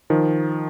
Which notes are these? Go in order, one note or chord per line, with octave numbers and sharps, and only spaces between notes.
D#3 F3